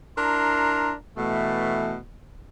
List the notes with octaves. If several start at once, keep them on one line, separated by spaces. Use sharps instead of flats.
D4 E4 A#4 A#5 C6
B2 E3 A3